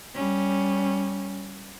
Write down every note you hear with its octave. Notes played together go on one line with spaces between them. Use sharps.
G3 C#4